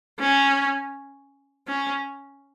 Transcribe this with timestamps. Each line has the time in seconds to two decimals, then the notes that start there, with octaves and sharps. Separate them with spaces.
0.20 C#4
1.67 C#4